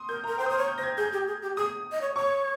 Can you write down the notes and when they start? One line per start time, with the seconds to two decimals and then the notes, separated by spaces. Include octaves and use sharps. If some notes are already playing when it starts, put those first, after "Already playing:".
Already playing: C6 D#6
0.09 A#4 G6
0.24 A#4 A#5
0.38 C5 G5
0.46 D#6
0.50 C5
0.53 C#5 F6
0.68 G6
0.78 C5 A#6
0.83 G#6
0.97 G#4 G6
1.13 G4
1.27 G#4
1.42 G4
1.57 G#4 D#6
1.92 D#5
2.01 C#5
2.16 C#5 C#6